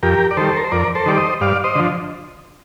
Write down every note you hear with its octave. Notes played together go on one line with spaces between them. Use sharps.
F2 G4 A#4
D5
D#3 G3 A4 C5
A#4
C5
F2 A#4 D5
A4 C5
D#3 G3 D5
C5 D#5
G2 D5 F5
C5 D#5
D3 F3